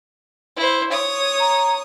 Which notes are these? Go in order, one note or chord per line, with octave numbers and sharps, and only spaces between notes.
E4 C5
C#5 D#6
A#5